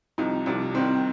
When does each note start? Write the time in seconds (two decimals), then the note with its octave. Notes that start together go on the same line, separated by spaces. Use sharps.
0.18 C2 C3 F3 D#4
0.46 C2 C3 F3 D4
0.74 C2 C3 D#3 C4